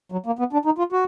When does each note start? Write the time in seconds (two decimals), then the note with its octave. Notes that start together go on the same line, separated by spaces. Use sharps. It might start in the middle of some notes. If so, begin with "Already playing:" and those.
0.12 F#3
0.26 A#3
0.39 B3
0.53 D4
0.65 D#4
0.78 F4
0.92 F#4